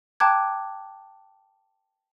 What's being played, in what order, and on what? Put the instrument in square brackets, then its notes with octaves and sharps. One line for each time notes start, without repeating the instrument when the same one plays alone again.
[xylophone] G5 A5 A#5 D6 F#6 G#6